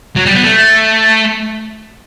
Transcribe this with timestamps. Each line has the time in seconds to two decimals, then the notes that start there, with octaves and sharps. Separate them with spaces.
0.16 F#3
0.26 G3
0.35 B3
0.44 A3